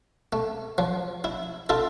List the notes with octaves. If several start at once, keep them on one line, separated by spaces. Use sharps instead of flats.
A3
F3
E4
E4 F4 A4